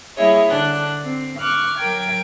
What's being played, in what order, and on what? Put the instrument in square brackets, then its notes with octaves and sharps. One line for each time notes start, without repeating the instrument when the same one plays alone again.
[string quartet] G3 A#3 E4 G#4 C#5 D#5
D3 D4 F#6
C4
C#6 D6 F6 F#6
F#3 A#4 G5 G#6